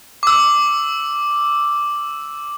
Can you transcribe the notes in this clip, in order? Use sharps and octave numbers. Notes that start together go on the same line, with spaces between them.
D6 E6